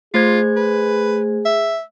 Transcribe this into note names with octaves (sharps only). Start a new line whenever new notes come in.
A3 F4 G#4 C5 G#6
B4
E5